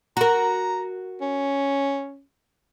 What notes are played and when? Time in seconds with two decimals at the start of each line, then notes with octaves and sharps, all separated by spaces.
0.17 F#4 A#4 A#5
1.21 C#4